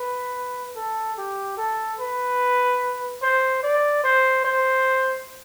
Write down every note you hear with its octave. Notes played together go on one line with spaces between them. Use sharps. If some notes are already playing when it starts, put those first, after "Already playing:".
Already playing: B4
A4
G4
A4
B4
C5
D5
C5
C5